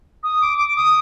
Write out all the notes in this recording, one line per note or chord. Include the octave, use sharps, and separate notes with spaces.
D#6
D6
D6
D#6